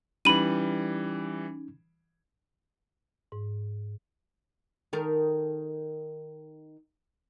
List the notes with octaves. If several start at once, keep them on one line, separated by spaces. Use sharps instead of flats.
E3 G3 C#4 D#4 B5 D#7
G#2
D#3 A4 A#4